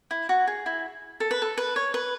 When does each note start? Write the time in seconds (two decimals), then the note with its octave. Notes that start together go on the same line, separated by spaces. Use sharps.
0.11 E4
0.29 F#4
0.47 G#4
0.66 E4
1.20 A4
1.31 B4
1.42 A4
1.58 B4
1.76 C#5
1.94 B4